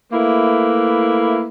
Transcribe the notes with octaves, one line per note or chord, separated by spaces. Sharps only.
A3 A#3 E4 B4